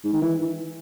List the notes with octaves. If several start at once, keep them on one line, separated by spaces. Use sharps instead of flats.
G#2
D#3
E3